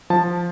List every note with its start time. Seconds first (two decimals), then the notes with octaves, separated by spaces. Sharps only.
0.10 F3 A5